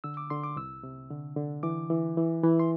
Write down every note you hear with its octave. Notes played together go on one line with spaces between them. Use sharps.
D3 E6
D6
D3 C6
D6
C2 E6
C3
D3
D3
E3 D6
E3
E3
E3
C6